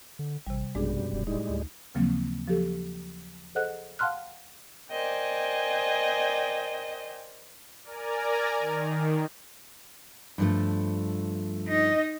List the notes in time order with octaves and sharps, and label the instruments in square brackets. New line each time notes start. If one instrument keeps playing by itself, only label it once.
[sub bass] D3
[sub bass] A1 [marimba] C3 G3
[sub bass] A1 [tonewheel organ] F#2 B2 G3 [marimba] G#3 D4 G#4
[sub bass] D#1
[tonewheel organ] A2 G3 G#3 [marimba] D#4
[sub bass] D2
[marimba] D#2 C#3 F3 F#3 A#3 C4
F3 F#3 G4 A4
G#4 A4 C5 D#5 F#5 F#6
F5 F#5 A5 C6 F6 F#6
[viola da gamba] A#4 C5 D5 [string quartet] D#5 [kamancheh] G5 G#5
[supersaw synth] A#4 D5 G#5 A#5
D#3
[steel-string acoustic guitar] G2 F3 A3
[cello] D#4 D#5